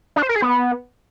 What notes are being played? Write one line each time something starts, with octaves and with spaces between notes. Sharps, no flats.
D4
C5
A#4
G#4
B3